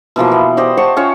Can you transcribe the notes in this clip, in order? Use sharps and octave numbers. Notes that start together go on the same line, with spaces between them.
B2 E3 F3 A#3
B3
G4 C5 D5 D#5
C5 F#5 A5 C#6
C#4 F4 C#5 C#6